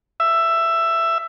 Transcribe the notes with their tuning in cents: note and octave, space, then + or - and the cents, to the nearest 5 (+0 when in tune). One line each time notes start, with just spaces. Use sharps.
E5 +10